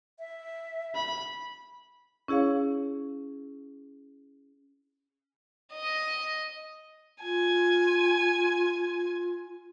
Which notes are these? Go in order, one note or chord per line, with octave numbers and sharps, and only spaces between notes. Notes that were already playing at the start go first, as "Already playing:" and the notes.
E5
B5
C#4 E4 G#4 C#5 F5
D#5
F4 G#5